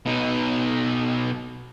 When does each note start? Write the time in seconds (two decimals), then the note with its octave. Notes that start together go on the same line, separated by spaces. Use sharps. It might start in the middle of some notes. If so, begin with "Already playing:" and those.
0.06 B2 D#4